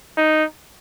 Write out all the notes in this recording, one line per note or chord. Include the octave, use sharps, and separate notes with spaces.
D#4